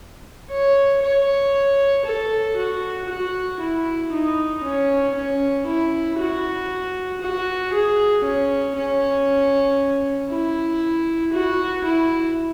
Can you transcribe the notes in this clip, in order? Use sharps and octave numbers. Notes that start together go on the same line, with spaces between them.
C#5
C#5
A4
F#4
F#4
E4
D#4
C#4
C#4
E4
F#4
F#4
G#4
C#4
C#4
E4
F#4
E4